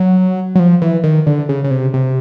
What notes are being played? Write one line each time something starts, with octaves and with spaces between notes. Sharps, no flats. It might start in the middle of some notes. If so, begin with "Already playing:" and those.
Already playing: F#3
F#3
F3
E3
D#3
D3
C#3
C#3
C3
C3